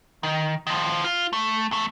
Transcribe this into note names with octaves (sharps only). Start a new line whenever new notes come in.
D#3
D#3 F3
F4
A3
E2 A3